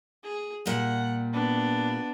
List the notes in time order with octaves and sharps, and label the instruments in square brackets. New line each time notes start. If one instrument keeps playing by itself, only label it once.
[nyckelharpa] G#4
[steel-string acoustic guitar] A#2 G3 [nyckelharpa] F#5
[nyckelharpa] B3 D4